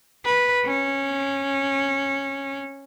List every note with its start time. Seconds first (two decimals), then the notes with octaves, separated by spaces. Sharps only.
0.25 B4
0.65 C#4